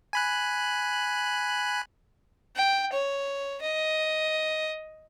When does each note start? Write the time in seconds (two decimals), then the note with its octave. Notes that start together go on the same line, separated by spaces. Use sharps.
0.13 G#5 B5 F#6
2.56 G5
2.93 C#5
3.62 D#5